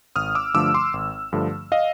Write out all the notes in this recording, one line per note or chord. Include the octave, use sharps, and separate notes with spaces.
G#1 D#6 F6
D6 E6
G2 D3 F3 A3 D6 E6
C6 D6
G#1
G2 D3 F3 A3
D#5 F5